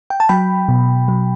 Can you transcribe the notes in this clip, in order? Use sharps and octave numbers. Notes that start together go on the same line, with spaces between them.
G5
A5
F#3 G5 B5
B2
F#3